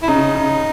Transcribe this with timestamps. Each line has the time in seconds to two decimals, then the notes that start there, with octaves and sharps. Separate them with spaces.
0.03 E4
0.08 C#3 D#4
0.35 C#3